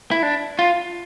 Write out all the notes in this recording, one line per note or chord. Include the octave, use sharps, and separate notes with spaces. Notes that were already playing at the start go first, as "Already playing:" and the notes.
E4
D4
F4